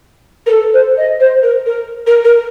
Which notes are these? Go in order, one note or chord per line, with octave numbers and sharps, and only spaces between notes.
A#4
A4
C5
D#5
C5
A#4
A#4
A#4
A#4